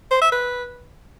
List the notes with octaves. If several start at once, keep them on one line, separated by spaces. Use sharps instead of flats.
C5
E5
B4